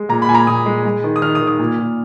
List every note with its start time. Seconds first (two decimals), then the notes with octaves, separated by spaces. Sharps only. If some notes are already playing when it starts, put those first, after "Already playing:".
Already playing: G#3
0.09 A#2 A#5
0.22 B5
0.28 A#2 G#5
0.34 A#5
0.47 A#2 D#6
0.66 G#3
0.85 G#3
1.04 D#3
1.16 D#6
1.22 D#3 F6
1.35 D#6
1.41 D#3
1.47 D#6
1.59 A#2
1.79 A#2